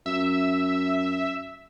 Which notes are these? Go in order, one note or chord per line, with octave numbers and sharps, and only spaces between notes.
F#2 E5